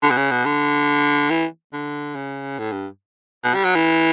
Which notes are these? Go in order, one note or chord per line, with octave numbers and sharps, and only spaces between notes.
D3
B2
C#3
B2
D3
E3
D3
C#3
A2
G2
B2
G3
F#3
E3